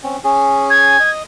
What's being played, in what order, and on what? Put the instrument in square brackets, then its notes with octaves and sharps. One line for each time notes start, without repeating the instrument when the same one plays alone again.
[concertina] C4 C#4
C#4 G#4
[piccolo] G#6
[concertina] D#5